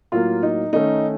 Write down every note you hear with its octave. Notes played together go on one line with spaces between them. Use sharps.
A2 F#3 A#3 F4
D#4
D#3 A3 C#4 D#4